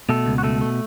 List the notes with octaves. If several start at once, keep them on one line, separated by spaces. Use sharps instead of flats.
B2 A3 A4
C#2
F#4
B2 A3 A4
A3